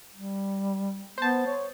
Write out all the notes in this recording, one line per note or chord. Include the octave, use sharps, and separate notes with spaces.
G3
B3 C5 A5
C#5